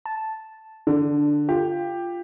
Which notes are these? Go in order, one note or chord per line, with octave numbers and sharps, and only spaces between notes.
A5
D3 D4
F4 G4